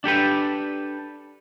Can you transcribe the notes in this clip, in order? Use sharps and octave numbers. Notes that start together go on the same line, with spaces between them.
D4 G4 A4 B4